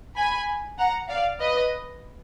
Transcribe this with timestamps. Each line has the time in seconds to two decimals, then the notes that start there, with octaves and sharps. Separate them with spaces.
0.15 G#5 B5
0.78 F#5 A#5
1.09 D5 F5
1.40 B4 D#5